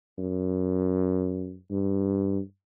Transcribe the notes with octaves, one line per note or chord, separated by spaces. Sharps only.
F#2
G2